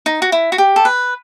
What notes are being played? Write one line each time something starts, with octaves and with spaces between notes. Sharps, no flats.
D#4
F#4
E4
F#4
G4
A4
B4